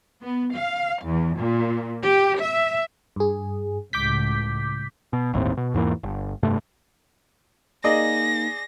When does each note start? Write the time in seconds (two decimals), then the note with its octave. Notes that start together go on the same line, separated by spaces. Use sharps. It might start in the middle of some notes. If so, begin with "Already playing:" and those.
0.23 B3
0.56 F5
1.05 E2
1.37 A#2
2.03 G4
2.41 E5
3.16 G2 G#4
3.93 C#2 A2 D6 G6 B6
5.13 B2
5.33 G1 D#2 A2 C4
5.57 B2
5.74 E2 G#2 E3 A#3
6.03 G1
6.43 F1 G2 C3 A3
7.84 A#3 D#4 G#4 D5 D#5 A#6